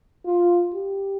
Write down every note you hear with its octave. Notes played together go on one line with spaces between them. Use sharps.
F4
G4